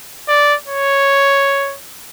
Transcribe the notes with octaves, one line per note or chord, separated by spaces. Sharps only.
D5
C#5